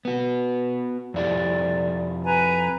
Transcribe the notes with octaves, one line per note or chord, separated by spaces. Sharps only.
B3 F#4
F2 E4 G4 D5
B4 G#5 A#5